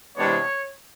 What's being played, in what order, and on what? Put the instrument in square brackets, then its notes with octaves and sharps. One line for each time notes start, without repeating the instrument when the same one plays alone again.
[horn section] C3 E3 G#3 B3 D4 C#5